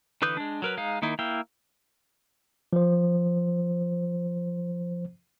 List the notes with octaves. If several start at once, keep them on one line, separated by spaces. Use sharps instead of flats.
D3 E3 B4 D#6 G6
G#3 D4
F#3 A#4 B4
G#3 D#4 F5
D#3 A#3 D#4 E4
A#3 E4 F5 G5
F3 C5